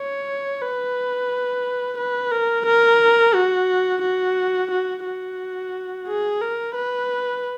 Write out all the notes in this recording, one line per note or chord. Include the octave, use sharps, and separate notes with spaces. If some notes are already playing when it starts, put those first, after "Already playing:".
Already playing: C#5
B4
B4
A#4
A#4
F#4
F#4
F#4
F#4
G#4
A#4
B4